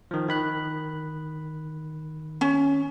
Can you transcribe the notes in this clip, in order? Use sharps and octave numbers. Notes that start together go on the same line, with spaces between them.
D#3 F3
D#3 B5 F#6
C#4